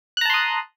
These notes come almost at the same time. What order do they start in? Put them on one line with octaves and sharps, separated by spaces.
F#6 A#5 A5 C6 D#6